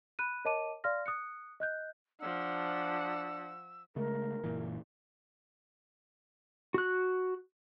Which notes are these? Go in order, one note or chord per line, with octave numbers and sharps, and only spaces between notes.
B5 F#6 D#7
A#4 C#5 D#5 A5 D6 D#7
D5 F5 C6 F6 A#6
D#6 F#6 C#7
D#5 F#6 G6
F3 D4 F#5 E6
C#3 G#3 A3 A#4
F#1 A#2 E3
F#4 F#6